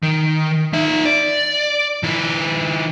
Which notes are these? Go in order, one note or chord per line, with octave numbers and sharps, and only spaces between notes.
D#3
D#4 E5
D5
D#3 E4